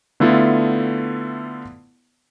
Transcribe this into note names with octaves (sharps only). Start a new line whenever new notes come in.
D3 A3 B3 E4 F4 A4